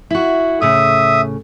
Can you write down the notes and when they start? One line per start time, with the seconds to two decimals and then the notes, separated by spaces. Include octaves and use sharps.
0.11 E4 F#4
0.62 A2 C#3 E5 D#6